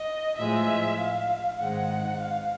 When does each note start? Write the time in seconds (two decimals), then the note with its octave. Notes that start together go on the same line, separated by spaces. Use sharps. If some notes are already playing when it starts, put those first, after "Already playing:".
Already playing: D#5
0.37 A2 F3 G#3 E5
0.98 F5
1.59 G#2 D#3 G#3 C4 F#5
2.20 F5